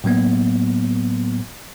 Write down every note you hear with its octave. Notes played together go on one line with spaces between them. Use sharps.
A2 F#3 A#3 B3